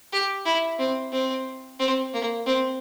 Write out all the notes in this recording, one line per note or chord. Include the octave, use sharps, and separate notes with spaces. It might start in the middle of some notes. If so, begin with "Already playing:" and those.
G4
E4
C4
C4
C4
A#3
C4